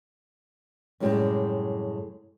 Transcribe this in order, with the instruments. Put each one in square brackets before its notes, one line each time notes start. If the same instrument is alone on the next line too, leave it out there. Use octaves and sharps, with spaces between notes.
[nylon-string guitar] F#2 A2 C3 G3 G#3